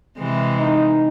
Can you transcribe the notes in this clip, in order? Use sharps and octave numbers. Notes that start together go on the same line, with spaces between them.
C3 E3 G#3
D#4